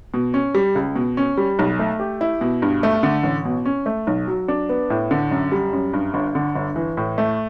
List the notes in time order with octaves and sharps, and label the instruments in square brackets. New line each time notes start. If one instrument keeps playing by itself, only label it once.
[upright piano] B2
C#4
G3
C#2
B2
C#4
G3
B1
A3
G4
E4
B2
G2
A3
D3
A1
B2
C#4
A3
B1
F#3
D4
B3
A2
D3
F#2
G3
F#2
G2
G1
D3
G1
E3
A2
A3